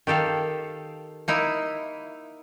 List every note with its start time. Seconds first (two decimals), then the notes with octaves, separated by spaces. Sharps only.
0.07 D#3 G4 A4 F5
1.28 A#3 D#4 E4